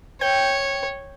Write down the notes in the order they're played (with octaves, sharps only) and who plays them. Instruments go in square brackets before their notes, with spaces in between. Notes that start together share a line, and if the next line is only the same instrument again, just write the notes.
[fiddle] C#5 [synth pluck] G5 G6